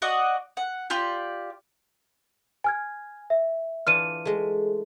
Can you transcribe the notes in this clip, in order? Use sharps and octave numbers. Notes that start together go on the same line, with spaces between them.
F#4 D5 D#5 F#5
F#5
F4 G4 D5
G#5 F6 G#6
E5
E3 D4 F4 F6 D#7
G#3 A3